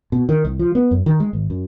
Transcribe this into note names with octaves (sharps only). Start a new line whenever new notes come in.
B2
D#3
C2
F3
B3
F#2
D#3
G#3
G#1
F#2